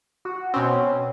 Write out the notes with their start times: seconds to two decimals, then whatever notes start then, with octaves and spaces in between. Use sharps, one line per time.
0.25 F#4
0.54 B2 C4 C#4